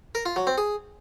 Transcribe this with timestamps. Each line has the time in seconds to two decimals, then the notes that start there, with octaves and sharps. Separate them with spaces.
0.15 A#4
0.26 F4
0.36 F#3
0.47 C4
0.58 G#4